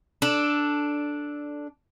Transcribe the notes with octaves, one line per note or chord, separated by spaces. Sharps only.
D4 A4